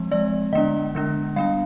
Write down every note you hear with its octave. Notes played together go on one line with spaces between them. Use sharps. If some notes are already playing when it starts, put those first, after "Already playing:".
Already playing: F3 G#3 C4
F3 G#3 C4 D5
D3 G#3 B3 D4 D#5
D3 G#3 B3 D4
G3 B3 D4 F5